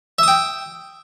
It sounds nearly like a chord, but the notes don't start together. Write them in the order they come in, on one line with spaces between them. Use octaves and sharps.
E5 D#6 G5